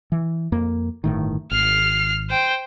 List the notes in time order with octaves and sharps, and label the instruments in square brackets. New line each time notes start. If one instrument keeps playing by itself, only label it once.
[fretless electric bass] E3
F2 A#3
G1 A2 D#3
[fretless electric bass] G#1 [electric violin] F6 C7
[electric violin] C5 G5